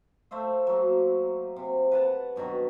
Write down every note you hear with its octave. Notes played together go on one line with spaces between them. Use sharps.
A3 C5 E5 F5
F#3 A#3
C3
B4 F#5 A5
G2 B2 D#3 F#3